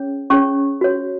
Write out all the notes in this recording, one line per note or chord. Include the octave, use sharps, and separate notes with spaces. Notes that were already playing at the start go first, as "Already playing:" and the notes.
Already playing: C#4 G#4 C#5
C#4 G#4 C#5 C#6
F#4 C#5